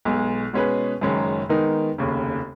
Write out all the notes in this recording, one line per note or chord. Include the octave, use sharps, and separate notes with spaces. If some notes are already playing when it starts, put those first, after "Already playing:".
B1 B2 G#3
B2 G#3 C#4 G#4 B4
F#1 F#2 D#3 G#3 C#4
D#3 G#3 B3 D#4 A#4
F1 D#2 C#3